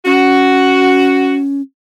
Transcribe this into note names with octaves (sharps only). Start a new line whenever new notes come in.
C#4 F#4